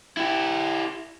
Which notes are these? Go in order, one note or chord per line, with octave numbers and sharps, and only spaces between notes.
E4 G4